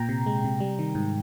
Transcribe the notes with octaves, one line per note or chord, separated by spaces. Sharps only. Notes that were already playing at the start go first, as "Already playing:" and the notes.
Already playing: A#2 G5 A#5
C3
G#3
C3
G3
D#3
G#2